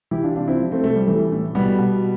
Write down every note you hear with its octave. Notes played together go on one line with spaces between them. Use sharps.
E3 E4 G4
D4 F4
C3 D4 F4
C4 E4
F3
A3 C4
C3 A3
G3
E3 A3
A2
B2 G3 B3
B2